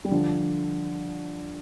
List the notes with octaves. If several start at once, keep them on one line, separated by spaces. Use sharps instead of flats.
G3
D3 F3